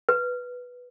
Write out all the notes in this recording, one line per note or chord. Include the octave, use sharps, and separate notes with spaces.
B4